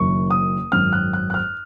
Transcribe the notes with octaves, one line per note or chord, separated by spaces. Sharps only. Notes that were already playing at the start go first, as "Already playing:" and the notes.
Already playing: F#1 F#2 D#3 C#6
D#6
G#1 F#2 D#3 F6
F#6
F#6
F#6
F6